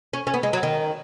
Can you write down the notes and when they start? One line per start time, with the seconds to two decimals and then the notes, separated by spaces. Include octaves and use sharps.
0.13 C#4
0.27 C#4
0.34 B3
0.43 G#3
0.53 F#3
0.63 D#3